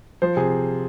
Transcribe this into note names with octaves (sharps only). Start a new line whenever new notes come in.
F3 C5
C3 G#4